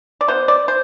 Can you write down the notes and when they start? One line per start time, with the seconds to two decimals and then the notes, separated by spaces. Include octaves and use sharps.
0.21 D5
0.28 B2 B3 C5
0.48 D5
0.68 C5